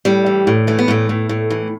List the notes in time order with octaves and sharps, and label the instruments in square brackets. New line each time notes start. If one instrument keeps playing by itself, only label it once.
[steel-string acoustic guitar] A2 G3
E3
A2
E3 A3
B3
A2 A3
A2
A2
E3